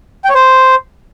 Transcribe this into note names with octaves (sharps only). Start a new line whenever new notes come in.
G5
C#5
C5